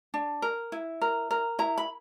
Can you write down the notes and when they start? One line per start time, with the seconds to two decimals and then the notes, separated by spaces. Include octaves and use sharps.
0.14 D4
0.42 A#4
0.72 E4
1.01 A#4
1.31 A#4
1.59 E4 A#5
1.78 B5